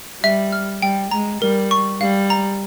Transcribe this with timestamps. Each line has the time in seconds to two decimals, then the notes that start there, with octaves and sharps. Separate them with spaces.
0.23 G3 E5
0.52 F6
0.82 G3 G5
1.11 G#3 A#5
1.41 G3 A#4
1.71 C#6
2.01 G3 F5
2.30 A#5